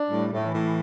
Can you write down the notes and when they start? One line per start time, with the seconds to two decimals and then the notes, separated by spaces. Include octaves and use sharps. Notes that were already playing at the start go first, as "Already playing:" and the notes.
Already playing: D4
0.09 A2 G3
0.32 A2
0.43 E3
0.54 A2